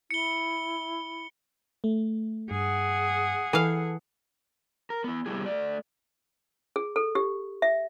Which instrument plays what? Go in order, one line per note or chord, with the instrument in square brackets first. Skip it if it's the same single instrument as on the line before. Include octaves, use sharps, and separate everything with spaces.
[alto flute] E4 [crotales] C#7 G7
[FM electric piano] A3
[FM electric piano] G2 [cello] G#4 F#5
[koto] E3 F5 [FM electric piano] A4
[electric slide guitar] A#4
B3 E4
C3 G3 B3 E4 G4 G#4
A3 D5
[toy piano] G#4
A4
G4
E5